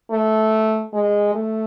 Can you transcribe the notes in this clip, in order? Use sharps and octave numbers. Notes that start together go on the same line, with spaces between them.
A3
G#3
A3